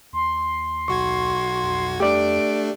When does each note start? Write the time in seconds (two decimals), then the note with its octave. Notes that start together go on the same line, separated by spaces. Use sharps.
0.13 D#2 C6
0.88 B1 F#4 C#6 G#6
1.63 F2
2.00 A3 D4 G4 D5 D7